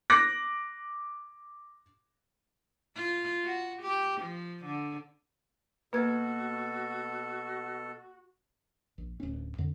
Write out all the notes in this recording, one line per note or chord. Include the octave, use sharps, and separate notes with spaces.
D6 F#6 A#6
F4
F#4
G4
F3
D3
B2 A#3 F#4 A4 B4 F5 G#6
A#1
D1 C#4
F2 D3